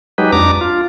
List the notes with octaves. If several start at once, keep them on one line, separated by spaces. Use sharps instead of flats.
F#3 G#3 D#4 G4 B4
F2 D4 A#5 D6
F4